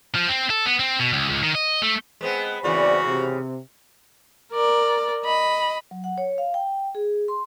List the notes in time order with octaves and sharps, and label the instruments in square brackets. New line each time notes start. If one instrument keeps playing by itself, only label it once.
[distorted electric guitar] F3
C4
A4
B3
C4
B2
C#2
C#2
D#3
D#5
A3
[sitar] G#3 B3 C4
[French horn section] E2 C4 D5 [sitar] G#2 C#3 E3 [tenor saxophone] F#4
[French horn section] C3
[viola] A#4 D5
D#5 B5
[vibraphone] F#3
F#5
C#5
F5
G5
G#4
C6